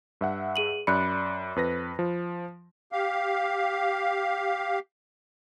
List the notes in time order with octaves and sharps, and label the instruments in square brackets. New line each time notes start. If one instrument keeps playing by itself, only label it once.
[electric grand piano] G2 E5 F#5
[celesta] G#4 D#7 F#7
[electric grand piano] F#2 D5 C#7 [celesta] B5 F#6
[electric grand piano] F2 B4 A#6
F3
[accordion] G4 F5